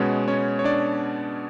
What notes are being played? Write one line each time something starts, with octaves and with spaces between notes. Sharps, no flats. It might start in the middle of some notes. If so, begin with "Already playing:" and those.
Already playing: B2 G#3 B3 C#4 C#5
C#4 C#5
C#5
D4 D5